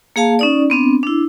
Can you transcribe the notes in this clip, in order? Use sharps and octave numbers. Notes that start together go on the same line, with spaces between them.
A#3 G#4 F5 A5
C#4 D#4 D5
B3 C4 D4
D4 E4